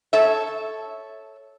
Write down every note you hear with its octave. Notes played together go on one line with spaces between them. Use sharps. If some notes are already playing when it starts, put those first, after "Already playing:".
A4 C#5 E5